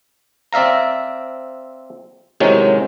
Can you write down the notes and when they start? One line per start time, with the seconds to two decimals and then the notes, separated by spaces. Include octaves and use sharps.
0.53 C4 D5 E5 F5 A#5
2.40 A2 C3 D#3 F#3 G#3 C#4